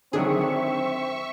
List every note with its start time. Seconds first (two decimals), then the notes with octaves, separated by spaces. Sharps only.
0.13 D3 D#3 F#3 C4 D4 G#4 E5 C#6